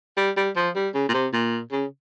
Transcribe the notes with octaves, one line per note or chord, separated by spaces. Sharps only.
G3
G3
F3
G3
C#3
A#2
C3
A#2
C#3